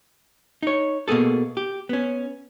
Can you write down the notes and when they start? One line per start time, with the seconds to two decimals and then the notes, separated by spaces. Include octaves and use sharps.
0.63 D#4 C#5
1.08 B2 A#3 B3 G#4 A4
1.57 G4
1.89 B3 C#4